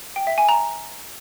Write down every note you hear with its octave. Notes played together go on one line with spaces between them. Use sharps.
G5
E5
G#5
A#5